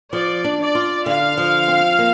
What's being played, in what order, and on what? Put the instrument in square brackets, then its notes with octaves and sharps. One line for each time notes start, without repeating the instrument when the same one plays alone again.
[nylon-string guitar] F3 [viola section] D5
[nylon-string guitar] D4
[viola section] D5
[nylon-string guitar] F4
[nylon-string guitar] D3 [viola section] F5
[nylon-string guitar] F3
C4
A#3